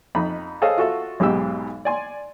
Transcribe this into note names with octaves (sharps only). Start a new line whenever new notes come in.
F2 D#4 B5
G#4 A4 C5 C#5 D#5 F5
F4 F#4 A4 E5
B1 G#2 B2 G4 E6
D5 G#5 C6